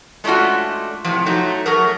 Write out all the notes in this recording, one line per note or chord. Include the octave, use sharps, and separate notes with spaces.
G#3 A3 C#4 D4 F4 F#4
A2 C3 F3
F#3 A3 D#4
F#3 A3 G#4 A#4